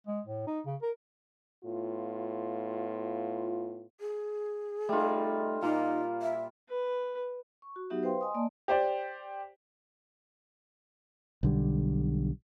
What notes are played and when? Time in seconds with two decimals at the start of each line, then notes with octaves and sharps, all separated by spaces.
0.07 G#3
0.26 A2
0.47 D#4
0.66 C#3
0.82 A#4
1.64 A2 B3 F4
4.00 G#4
4.89 G3 A3 D#4 F4
5.63 A#2 D#4 F4 A#4
6.22 E5
6.69 B4
7.62 C#6
7.76 F#4
7.90 F#3 B3 D#4 F#4 G4 E5
8.03 B4 C5 F5 G5 C6
8.21 D#5 G#5 C6 D#6
8.34 A#3 D5 D#5 A5
8.68 G4 C5 D5
11.43 B1 D3 G3